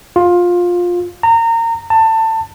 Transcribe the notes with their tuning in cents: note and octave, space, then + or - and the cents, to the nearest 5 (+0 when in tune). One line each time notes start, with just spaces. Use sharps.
F4 +15
A#5 -25
A5 +25